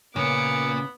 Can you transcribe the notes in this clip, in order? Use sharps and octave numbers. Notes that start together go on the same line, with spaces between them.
A#2 C#3 B3 D6 C#7